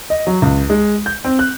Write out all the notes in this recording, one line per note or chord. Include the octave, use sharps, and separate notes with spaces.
D#5
F#3
C#2
G#3
G6
C4
F#6